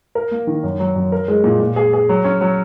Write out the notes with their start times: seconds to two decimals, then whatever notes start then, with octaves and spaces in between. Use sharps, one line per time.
0.15 A#4
0.31 A#3
0.47 D#3
0.63 F#2
0.80 F#3
0.95 F#2
1.12 A#4
1.28 G#3
1.44 A#2
1.60 A#2
1.76 G#4
1.93 G#4
2.09 F#3
2.24 C#4
2.41 F#3